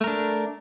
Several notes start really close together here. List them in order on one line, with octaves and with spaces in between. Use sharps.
A3 A#4 D4